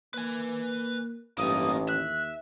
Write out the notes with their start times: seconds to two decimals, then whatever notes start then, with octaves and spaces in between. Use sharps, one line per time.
0.14 A#3 B4 G#5
1.38 A1 G2 A#3 D#4 D#6
1.89 D#2 E5 F#6